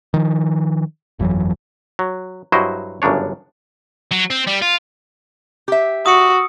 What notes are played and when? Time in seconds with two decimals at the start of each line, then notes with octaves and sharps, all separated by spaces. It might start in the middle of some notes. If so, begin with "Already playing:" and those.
0.14 D#3 F3
1.19 G1 F2 E3 F#3
1.99 F#3
2.52 G2 F#3 E4 F#4 C5 D#5
3.02 G1 F#2 C#3 D4 C#5
4.11 F#3
4.30 C4
4.47 G3
4.62 F4
5.68 G4 E5
6.06 F#4 D#6 E6 C#7